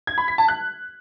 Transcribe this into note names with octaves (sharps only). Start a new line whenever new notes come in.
G#6
B5
B6
A5
F#6